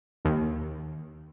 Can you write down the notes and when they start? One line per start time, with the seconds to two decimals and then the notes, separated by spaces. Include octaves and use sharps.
0.25 D#2